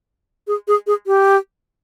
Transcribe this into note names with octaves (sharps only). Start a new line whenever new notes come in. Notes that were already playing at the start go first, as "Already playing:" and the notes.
G#4
G#4
G#4
G4